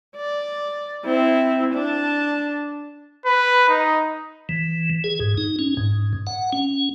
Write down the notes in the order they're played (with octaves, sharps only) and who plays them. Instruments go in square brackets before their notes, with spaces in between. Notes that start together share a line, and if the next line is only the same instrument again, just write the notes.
[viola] D5
C4 E4
D4 A5
[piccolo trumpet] B4
D#4
[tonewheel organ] E3
G#4
G#2
D#4
C#4
G#2
F#5
C#4